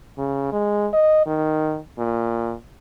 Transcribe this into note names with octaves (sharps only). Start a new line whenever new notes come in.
C#3
G#3
D#5
D#3
A#2